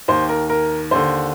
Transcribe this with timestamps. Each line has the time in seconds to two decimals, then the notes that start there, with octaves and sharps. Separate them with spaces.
0.08 D#2 D#3 C5
0.29 A#4
0.50 A#4
0.91 D#2 D3 C5